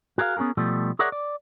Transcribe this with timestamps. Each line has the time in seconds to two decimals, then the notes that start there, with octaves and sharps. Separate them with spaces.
0.18 F#4 G#4 A#4 D#5 F5
0.37 B3 C#4 F#4 G#4 A#4
0.57 B2 F3 G3 A3
0.99 G#4 A#4 C#5 D5 E5 F#5
1.12 D5